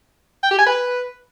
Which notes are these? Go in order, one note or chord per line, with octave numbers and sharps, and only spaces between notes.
G5
G4
G#5
B4